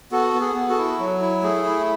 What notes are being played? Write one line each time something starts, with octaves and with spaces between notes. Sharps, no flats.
B3 F#4 A4
B3
G#4
B3
F#4 A4
E4
F#3
E4
A3 G#4
E4